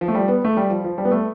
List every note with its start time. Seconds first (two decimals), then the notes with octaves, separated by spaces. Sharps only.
0.01 F3
0.08 A3
0.15 G3
0.28 B3
0.45 A3
0.57 G3
0.70 F3
0.84 F3
0.98 G3
1.05 B3
1.12 A3